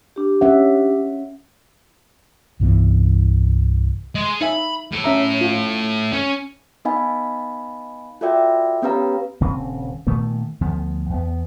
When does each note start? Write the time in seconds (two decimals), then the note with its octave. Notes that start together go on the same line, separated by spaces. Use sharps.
0.16 D4 G4
0.41 C#4 E5 F#5
2.60 C2 G2 E3 B3
4.15 G#3
4.41 D#4 E5 G#5 B5
4.92 A2 A4
5.04 C#4 E5 A#5
5.41 F4
6.13 C#4
6.85 B3 D#4 D#5 F5 G#5 B5
8.21 F4 F#4 A4 D5 E5 G5
8.82 B3 C#4 G4 B4 F5 A#5
9.41 D#1 C#3 C4
10.07 A#2 D#3 A3 B3
10.61 D2 F3 B3
11.09 E2 B3